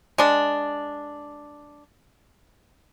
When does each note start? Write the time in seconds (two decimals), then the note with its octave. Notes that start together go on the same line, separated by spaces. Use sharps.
0.18 G#3 D4